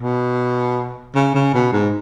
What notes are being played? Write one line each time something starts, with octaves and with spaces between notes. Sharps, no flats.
B2
C#3
C#3
B2
G#2